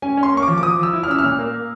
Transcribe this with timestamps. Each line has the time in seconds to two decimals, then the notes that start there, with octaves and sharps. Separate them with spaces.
0.02 C#4 G#5
0.17 C#4
0.23 C6
0.32 A#3 C#6
0.42 D6
0.48 F3
0.58 D6
0.63 F3 D#6
0.78 F3
0.83 E6
0.93 E4
1.03 F6
1.08 C#4 E6
1.19 A#2 F6
1.39 A#3
1.53 A#3